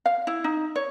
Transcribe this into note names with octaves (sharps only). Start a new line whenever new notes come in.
F5
E4
D#4
C#5